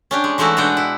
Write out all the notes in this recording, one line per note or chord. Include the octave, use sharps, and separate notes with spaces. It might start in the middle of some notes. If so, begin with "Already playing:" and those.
C#4 D4 G4
G#3
E3 G#3 A3 D#4 E4 F#4
B2 G#3 D4 F#5 G5
E4